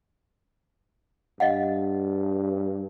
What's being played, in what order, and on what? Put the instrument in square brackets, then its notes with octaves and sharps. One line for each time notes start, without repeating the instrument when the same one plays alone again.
[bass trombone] G2 [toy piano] D#5 F5 F#5